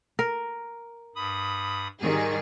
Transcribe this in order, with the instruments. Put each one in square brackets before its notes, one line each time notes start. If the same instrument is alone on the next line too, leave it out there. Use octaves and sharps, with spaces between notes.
[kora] A#4
[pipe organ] G2 B5 D#6
[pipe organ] G#2 [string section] D#3 G3 G#4